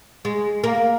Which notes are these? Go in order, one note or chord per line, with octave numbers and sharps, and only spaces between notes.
G#3
A#3